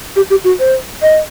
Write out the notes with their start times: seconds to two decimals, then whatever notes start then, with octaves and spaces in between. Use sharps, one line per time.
0.16 G4
0.30 G4
0.44 F#4
0.60 C5
1.02 D#5